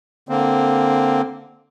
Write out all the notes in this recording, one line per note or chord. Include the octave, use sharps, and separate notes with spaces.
D3 A#3 C4